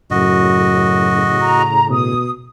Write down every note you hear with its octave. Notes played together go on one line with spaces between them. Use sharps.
F#2 A2 C#3 F#4 D#5
A#5
B2 D#6